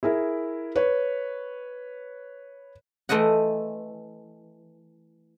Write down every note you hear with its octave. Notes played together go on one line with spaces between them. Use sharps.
E4 G#4 A#4 E5
B4 C#5
E3 A3 C5 D#5 F#5